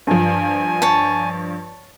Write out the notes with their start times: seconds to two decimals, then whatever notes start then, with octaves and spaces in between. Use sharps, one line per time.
0.07 G2 F3 G#5
0.82 C#5 A5